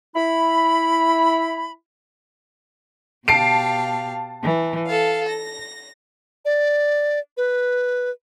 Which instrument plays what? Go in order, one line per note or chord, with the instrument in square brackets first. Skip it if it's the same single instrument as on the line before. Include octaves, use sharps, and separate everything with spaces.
[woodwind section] E4 B5
[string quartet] B2 G4 F5 [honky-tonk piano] A5 C7 D7
[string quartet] E3
A4 F5
A#6
[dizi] D5
B4